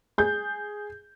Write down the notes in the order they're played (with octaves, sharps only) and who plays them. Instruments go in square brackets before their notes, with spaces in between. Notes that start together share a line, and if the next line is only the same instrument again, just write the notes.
[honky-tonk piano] G#4 G6